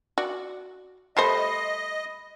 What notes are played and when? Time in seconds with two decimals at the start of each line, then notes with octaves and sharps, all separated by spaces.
0.18 F#4 D5
1.17 G3 A3 C5 D#5 B5 C7